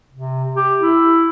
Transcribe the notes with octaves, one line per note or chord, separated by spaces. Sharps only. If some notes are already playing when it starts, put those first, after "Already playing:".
C3
G4
E4